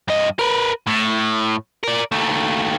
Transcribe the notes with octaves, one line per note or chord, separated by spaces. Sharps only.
G2 D#5
A#4 B4
A2
A#4 D5
D#2 A3